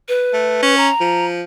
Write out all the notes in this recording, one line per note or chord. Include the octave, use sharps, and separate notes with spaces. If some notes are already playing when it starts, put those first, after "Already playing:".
B4
A3
C#4
A#5
F3